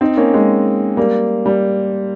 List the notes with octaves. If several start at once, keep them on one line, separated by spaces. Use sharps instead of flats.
C4 D#4
A#3 C#4
G#3 C4
G3 A#3
G3